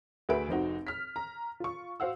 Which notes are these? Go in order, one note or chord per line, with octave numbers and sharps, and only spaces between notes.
D2 F#4 G#4 B4 E5 D7
F1 C4 D#4 F#4
F6 B6
A#5
F4 C#6
F#4 C5 F5 F#5 E6